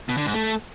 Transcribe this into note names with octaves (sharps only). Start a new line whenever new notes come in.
B2
D3
G#2
A3